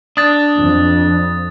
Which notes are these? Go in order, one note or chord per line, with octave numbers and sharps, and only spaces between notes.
D4 D#6 A6
F2